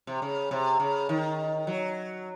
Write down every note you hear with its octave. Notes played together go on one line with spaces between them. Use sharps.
C3
C#3
C3
C#3
D#3
F#3